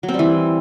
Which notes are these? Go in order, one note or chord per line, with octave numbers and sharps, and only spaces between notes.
F#3
C4
G3
E3